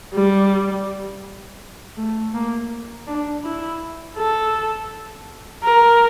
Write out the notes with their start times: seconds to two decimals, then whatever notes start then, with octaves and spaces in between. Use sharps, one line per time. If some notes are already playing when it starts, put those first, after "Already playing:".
0.15 G3
1.97 A3
2.34 A#3
3.07 D4
3.44 E4
4.17 A4
5.64 A#4